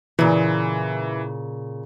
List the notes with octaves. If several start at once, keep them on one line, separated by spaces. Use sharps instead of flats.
A#2 C#3 E3